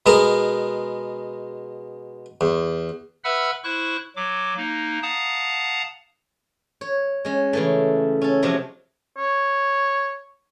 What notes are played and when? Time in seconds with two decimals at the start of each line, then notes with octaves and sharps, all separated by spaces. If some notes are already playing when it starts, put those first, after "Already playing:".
0.06 B2 G#3 B3 A#4 A#5
2.41 E2
3.24 B4 E5 F#5 B5 E6 F6
3.64 E4 C5 C#6 F#6
4.16 F#3 D6
4.57 A#3 D#4
5.02 F5 F#5 A5 A#5 D#6
6.81 C#5
7.25 G#3 C#4
7.53 C#3 E3 A3
8.22 C#4 A4
8.42 C3 F3 F#3 G#3 A3
9.17 C#5